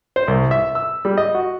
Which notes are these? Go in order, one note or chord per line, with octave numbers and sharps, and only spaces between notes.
C5
C2
E5
E6
G3
D#5
F#4